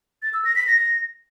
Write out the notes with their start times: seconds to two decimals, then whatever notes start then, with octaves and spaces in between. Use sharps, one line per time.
0.23 A6
0.34 E6
0.45 A#6
0.56 B6
0.67 A#6